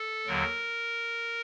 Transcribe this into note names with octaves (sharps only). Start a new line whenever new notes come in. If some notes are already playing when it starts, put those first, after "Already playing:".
Already playing: A4
D#2 D3 F#3 A#4